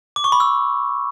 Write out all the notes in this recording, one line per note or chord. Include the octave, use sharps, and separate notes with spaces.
D6
C#6
B5
E6